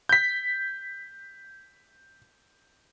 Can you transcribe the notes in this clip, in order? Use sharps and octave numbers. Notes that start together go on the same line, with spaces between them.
G6 B6